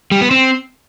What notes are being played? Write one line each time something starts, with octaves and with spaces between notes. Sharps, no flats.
G3
B3
C4